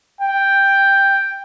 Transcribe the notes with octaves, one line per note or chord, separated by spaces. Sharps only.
G5